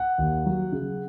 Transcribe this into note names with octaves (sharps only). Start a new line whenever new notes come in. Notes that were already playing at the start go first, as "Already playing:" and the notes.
Already playing: F#5
D#2
F#3
C#3